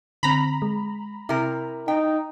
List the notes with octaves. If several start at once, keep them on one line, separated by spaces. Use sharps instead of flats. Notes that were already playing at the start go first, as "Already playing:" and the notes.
D3 C4 A#5 B5
G#3
C3 E4 A#4
D#4 G5